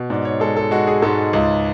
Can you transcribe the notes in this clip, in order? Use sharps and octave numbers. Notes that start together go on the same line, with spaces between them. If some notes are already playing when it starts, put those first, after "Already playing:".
Already playing: B2
G#2 D5
C#5
G#3 A4
A4
G#3 F#4
G#4
G#2 A4
C#2